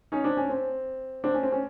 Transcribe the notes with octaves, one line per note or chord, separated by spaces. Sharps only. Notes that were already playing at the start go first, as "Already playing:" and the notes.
C#4 D#4
C4 D4
C#4
C4
C4 D4
C#4
C4
C#4